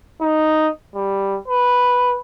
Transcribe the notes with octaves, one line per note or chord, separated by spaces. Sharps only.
D#4
G3
B4